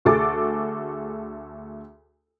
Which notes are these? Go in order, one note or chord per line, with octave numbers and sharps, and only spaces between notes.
D2 F#4 G#4 A4 D6 A6